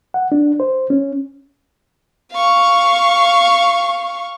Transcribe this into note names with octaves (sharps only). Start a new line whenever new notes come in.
F#5
D4
C5
C#4
F5 C#6